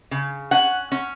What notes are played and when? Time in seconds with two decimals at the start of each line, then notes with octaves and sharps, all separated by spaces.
0.11 C#3
0.51 C#4 F#5
0.92 C#4